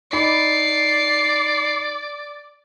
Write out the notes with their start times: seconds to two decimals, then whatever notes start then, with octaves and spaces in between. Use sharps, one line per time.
0.13 D#4 D5 B5 C7